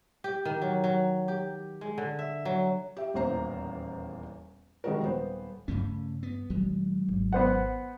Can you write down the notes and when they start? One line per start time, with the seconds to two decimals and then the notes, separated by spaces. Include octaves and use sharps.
0.24 G4
0.45 D#3
0.62 F#3
0.84 F#3
1.28 G4
1.81 G#3
1.98 D3
2.19 E5
2.45 F#3
2.97 G4 E5
3.14 D#1 A1 E2 A#3 C5 A#5
4.84 C3 D#3 G3 G#3 F#4 A#4
5.02 D#1 B3 C5
5.68 G2 C#3 A3 C#4
6.23 B3
6.50 A#1 D#3 F#3 G#3
7.08 G#1
7.33 B3 C5 F#5